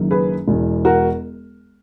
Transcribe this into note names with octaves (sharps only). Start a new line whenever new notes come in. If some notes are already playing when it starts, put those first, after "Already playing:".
Already playing: F#1 F#2 D#3 G#3
G#4 B4
E1 E2 B2
F#4 A#4